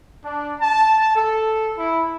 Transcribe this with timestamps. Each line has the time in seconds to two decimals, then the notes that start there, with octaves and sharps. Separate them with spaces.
0.25 D4
0.60 A5
1.16 A4
1.78 E4